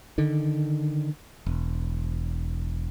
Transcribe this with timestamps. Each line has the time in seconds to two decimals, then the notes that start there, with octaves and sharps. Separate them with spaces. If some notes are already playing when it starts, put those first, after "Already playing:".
0.18 D3 D#3
1.46 E1